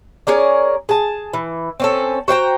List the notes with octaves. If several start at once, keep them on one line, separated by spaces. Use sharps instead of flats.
C#4 G#4 A#4 D5
G#4 A5
E3
C4 C#4 A4
F#4 C5 G5 A#5